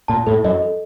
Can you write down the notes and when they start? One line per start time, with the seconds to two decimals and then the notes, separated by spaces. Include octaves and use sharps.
0.08 A#2 A5
0.27 A2 A4
0.44 F#2 D#5
0.62 A4